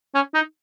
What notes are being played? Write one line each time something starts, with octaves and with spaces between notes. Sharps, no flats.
C#4
D#4